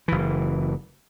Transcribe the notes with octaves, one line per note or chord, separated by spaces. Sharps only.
F#1 E3